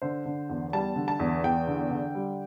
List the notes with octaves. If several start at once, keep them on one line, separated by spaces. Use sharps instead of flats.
D3 C5
D3
E2
G3 A5
D3
A5
E2
E2 G5
D3
D3
G3